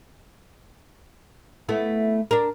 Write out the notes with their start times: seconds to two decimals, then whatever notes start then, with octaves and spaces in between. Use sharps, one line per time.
1.69 A3 B3 E4
2.31 D4 A#4